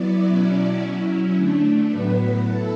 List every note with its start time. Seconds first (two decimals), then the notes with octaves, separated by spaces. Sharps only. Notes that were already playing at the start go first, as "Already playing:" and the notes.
Already playing: F#3 B3 E4 D5
0.26 B2 F#3 C#4 E4
0.82 F#3 C#4 E4
1.36 D3 A3 D4
1.90 A2 F#3 B3 B4
2.45 E4 A4